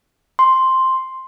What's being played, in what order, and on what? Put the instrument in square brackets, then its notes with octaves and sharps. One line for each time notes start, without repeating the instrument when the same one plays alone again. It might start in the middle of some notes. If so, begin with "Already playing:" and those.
[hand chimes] C6